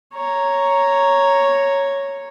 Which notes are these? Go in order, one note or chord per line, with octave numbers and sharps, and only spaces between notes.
C#5 A#5